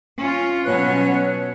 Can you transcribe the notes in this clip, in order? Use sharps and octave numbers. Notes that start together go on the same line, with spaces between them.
C#4 F4
B2 F#3 C#4 B4 C#5 F#6